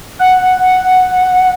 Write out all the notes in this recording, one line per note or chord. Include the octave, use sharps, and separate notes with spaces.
F#5